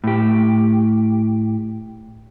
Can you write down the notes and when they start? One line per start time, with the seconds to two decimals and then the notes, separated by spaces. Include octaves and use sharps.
0.04 A2 G4